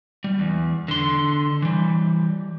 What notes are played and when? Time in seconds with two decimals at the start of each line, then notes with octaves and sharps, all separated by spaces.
0.24 G3
0.39 E2
0.88 D3 C6
1.62 E3 G3